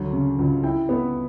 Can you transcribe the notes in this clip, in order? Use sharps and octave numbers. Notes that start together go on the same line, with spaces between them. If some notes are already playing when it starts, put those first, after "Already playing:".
Already playing: D2 F#3
C#3
C#2
E4 G5
B3